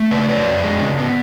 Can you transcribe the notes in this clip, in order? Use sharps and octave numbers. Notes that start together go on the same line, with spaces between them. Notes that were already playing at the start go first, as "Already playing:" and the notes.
Already playing: A3
C#3 B4 D5
F#3 B4 D5
F2
G#3
C#3
B3